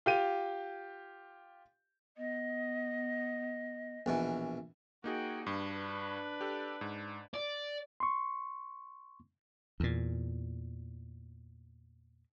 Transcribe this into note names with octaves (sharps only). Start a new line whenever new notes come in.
F4 G4 D#7
B3 D#5
A#1 B2 E3
A#3 D#4 F#4 G#4 G5
G2 D4 B4
G4 A4
G#2
D5
C6 C#6
E2 A#2